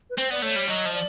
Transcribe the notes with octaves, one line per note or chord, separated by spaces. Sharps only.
B4
C4 C5
B3 D5
A3 C#5
G3
F#3 D#5
F3
D5